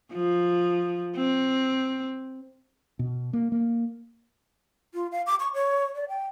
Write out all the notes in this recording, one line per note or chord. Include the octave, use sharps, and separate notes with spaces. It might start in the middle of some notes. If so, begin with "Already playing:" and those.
F3
C4
B2
A#3
A#3
F4
F5
D6
C#6
C#5
D5
G5